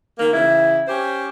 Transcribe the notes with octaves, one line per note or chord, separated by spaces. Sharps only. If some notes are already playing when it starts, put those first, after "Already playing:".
D#3 A#3
C#3 E3 E4
C#4 G4 C5